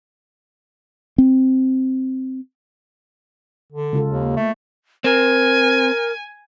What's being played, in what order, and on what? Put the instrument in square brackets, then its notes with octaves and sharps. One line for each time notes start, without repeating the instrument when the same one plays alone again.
[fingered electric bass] C4
[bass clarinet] D3
[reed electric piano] C#3 [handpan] G#3 F4 A4
[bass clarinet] D#2
[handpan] A#3
[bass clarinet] A3
[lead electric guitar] C4 [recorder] A#4 [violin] G#5